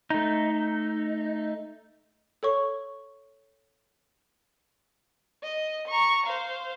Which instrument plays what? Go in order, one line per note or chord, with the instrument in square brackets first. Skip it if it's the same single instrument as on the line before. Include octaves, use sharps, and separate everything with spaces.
[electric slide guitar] A3 D#4
[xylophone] A4 C#5 C#6
[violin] D#5
A#5 C#6
C5 F5